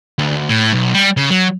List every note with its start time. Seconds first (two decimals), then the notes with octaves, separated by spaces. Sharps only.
0.18 D2
0.50 A2
0.73 B1
0.94 G3
1.17 C#3
1.30 F#3